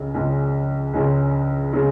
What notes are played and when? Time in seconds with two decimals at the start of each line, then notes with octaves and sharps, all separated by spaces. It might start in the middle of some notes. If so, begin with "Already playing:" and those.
Already playing: C#2 C#3
0.14 C#2 C#3 G#3
0.93 C#2 C#3 G#3
1.73 C#3 G#3